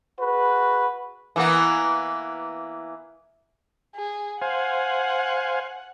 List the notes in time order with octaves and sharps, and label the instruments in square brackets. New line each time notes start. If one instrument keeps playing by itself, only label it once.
[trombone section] F#4 G#4 B4
[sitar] E3 A#3 B3
[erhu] G#4
[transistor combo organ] C5 F5 G#5 [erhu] F#5